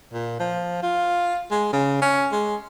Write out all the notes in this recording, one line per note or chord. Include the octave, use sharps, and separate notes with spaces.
A#2
F3
F4
G#3
C#3
C#4
G#3